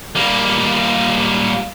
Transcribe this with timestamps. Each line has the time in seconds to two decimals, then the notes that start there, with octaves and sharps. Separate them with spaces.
0.15 G3 A#3